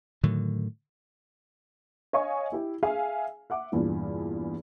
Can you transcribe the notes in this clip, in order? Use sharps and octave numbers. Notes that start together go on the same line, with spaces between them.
A2 D3 D#3 F#3
C#5 D#5 F5 G#5 C#6
E4 G4
G#4 E5 F5 G#5
E5 F#5 D6
E2 G2 A#2 E3